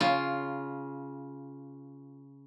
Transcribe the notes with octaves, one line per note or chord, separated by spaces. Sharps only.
C#3 F4